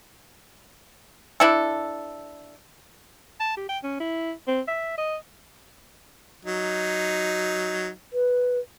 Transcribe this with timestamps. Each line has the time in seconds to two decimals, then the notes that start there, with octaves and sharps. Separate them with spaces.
1.40 D4 E4 A4
3.40 A5
3.57 G4
3.69 G5
3.83 C#4
4.00 E4
4.47 C4
4.68 E5
4.98 D#5
6.45 F#3 D#4
8.13 B4